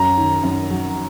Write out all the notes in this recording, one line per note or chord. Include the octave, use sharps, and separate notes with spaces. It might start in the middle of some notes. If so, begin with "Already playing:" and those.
Already playing: F#2 A#5
D#3
F#2
F#3